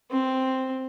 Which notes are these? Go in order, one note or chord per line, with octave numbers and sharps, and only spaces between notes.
C4